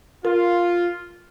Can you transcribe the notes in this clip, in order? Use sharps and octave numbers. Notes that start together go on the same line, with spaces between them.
F4 A#4